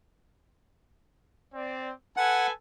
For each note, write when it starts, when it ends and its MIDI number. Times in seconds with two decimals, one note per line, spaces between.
1.54 1.92 60
1.54 1.92 74
2.17 2.51 69
2.17 2.51 71
2.17 2.47 78
2.17 2.51 80